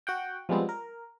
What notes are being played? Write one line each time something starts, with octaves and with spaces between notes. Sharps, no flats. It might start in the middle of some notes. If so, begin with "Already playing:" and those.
F#4 F#5 G5
F3 G3 G#3 B3 C4
A#4